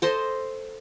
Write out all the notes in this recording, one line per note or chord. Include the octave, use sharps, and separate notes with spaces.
A4 C5 D#5 C6